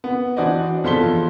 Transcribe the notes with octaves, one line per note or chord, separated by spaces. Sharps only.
B3
E3 D4 F#4 C5 D5 D#5
E2 F3 A4 C6 B6 G7